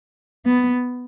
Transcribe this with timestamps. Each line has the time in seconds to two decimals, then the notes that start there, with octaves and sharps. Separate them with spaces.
0.46 B3